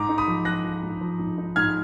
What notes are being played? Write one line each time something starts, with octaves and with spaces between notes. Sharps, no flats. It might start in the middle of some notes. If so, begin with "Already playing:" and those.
Already playing: G#2 A#5 D6
D#4
B5 D#6
F3
F3 F#6 A#6
F3
G#2
F3
G#2
D#4
G#2 F6 G#6